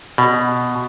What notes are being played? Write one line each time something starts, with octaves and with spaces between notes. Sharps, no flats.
B2